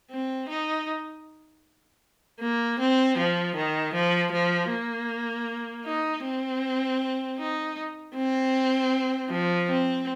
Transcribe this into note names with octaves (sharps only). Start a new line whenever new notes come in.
C4
D#4
A#3
C4
F3
D#3
F3
F3
A#3
D#4
C4
D#4
C4
F3
C4